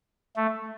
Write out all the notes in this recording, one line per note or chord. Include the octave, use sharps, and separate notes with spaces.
A3